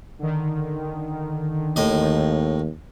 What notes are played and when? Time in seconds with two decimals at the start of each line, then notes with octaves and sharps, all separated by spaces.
0.19 D3 D#3
1.76 D#2 A2 D#5